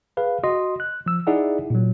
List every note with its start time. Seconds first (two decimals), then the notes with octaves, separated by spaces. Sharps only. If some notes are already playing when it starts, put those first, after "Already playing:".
0.17 G#4 B4 F5
0.43 F#4 D#5 C6
0.80 F#6
1.06 F3 E6
1.27 D#4 E4 G#4 D5 E5 F#5
1.70 A#2 F#3